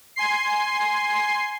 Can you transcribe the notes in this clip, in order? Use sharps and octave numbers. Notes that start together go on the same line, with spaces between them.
G#5 C6 C7